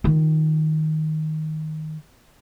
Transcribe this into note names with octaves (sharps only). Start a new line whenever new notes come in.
D#3 F4